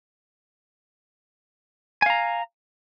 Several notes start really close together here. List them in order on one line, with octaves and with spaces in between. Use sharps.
G#5 F5 A#5